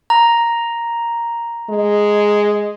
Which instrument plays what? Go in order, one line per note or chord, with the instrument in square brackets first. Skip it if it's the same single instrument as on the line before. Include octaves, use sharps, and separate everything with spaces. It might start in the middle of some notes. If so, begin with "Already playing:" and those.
[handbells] A#5
[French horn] G#3